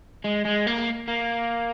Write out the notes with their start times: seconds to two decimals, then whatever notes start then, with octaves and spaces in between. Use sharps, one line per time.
0.24 G#3
0.45 G#3
0.67 A#3
1.08 A#3